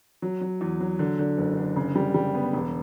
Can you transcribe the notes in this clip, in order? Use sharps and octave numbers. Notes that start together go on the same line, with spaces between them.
F#3
F#3
E2
F#3
D3
D3
F#1
D3
C#3
G3
G3
B3
E1